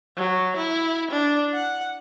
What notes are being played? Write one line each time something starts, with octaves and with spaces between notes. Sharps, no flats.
F#3
E4
D4
F#5